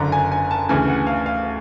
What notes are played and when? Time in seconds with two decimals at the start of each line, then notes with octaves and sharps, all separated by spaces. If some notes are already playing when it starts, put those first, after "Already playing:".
Already playing: F#1 F#2 D3 A#5
0.12 G#5
0.32 G#5
0.51 A5
0.69 D2 C#3 E3 G#5
0.88 F#5
1.07 F5
1.26 F5